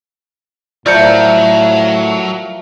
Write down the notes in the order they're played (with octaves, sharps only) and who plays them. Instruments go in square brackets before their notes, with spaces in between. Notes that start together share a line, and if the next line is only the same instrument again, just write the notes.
[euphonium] A2 [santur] F3 A#4 E5 [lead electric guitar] F#3 [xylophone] D5 G6 C#7